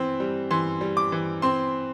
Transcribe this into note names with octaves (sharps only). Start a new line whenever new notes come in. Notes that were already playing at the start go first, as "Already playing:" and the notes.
Already playing: E3 C4
G3
E3 C6
G3
D6
E3
C4 C6